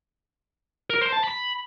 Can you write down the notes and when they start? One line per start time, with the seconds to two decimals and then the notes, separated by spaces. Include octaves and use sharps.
0.90 A#4
1.01 C5
1.12 A5
1.24 B5